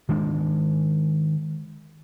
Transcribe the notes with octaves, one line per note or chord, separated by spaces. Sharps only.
D#3 G#3 D4